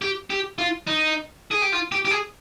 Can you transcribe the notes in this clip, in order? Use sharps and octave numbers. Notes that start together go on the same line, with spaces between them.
G4
G4
F4
D#4
G#4
G4
F4
G4
G4
G#4